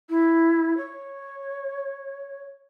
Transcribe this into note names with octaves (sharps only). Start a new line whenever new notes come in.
E4
C#5